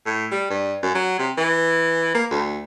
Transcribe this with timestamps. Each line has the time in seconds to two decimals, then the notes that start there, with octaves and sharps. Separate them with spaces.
0.06 A2
0.31 G3
0.50 G2
0.83 F#2
0.95 F#3
1.19 C3
1.37 E3
2.14 A#3
2.31 D2